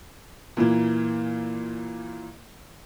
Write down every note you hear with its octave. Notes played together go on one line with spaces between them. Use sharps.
A#2 E3 A#3